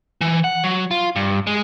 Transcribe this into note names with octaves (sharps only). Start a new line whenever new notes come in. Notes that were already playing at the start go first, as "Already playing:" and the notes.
E3
F#5
F#3
F4
G2
G#3